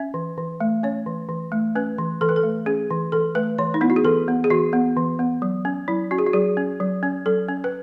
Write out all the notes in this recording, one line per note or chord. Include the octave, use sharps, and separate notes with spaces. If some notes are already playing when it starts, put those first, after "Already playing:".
Already playing: C#4 E5
E3
E3
A3
C#4 C#5
E3
E3
A3
C#4 B4
E3
E3 A4
B4
A4
A3
C#4 G#4
E3
E3 A4
A3 B4
E3 C#5
D#4
B3 E4
F#4
G#4
E3 A4
B3
G#4
E3 F#4
B3
E3
B3
F#3
C#4
F#3 E4
C#4 F#4
G#4
F#4
F#3 G#4
C#4
F#3
C#4
F#3 A4
C#4
B4